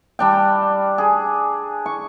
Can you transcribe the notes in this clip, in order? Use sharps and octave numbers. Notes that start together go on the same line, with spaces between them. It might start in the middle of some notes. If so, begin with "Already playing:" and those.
G3 D4 G5
G#4
C#6